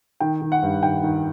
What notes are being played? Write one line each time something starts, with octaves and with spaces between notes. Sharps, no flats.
D#3 G5
D#3
F#5
G2
D#3 G5
D#3